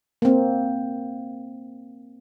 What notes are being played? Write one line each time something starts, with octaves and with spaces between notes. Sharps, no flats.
A#3 C4